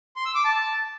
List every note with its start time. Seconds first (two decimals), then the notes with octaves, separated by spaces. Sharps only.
0.16 C6
0.26 E6
0.35 D6
0.44 A5